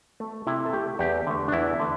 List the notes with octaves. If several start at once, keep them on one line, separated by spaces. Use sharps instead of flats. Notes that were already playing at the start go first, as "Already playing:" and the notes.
A3
C3 E4
A4
A3 G4
E2 G4
D3 A3
D4
E2 E4
D3 A3